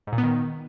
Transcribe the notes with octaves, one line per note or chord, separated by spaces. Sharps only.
G#2
A#2
B3
D#3